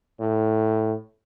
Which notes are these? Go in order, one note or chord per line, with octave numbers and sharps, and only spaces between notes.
A2